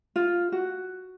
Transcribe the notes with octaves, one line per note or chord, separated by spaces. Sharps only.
F4
F#4